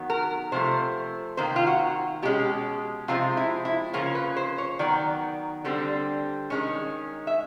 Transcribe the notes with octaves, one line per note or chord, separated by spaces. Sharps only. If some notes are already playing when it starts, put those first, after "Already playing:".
Already playing: D#3 F#3 B3
A#4
C3 F3 A3 C5
C3 D#3 A#3 C5
F4
F#4
B2 G#3 C#4 G4
C3 F3 G#3 C4 F4
E4
E4
C#3 F3 A#3 C#4 F4
B4
C5
C#5
D#3 F#3 B3 D5
D3 G3 C4
D#3 G#3 C#4
E5